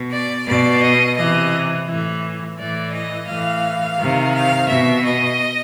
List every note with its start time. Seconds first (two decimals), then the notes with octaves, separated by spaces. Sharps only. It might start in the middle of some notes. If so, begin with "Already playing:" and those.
Already playing: B2
0.12 D5
0.47 B2 D5
0.82 D#5
1.17 C3 E3 D#5
1.88 A2 E3
2.58 A2 E3 D5
2.93 D#5
3.28 A2 E3 F5
3.99 C3 D#3
4.34 F5
4.68 B2 E5
5.04 D#5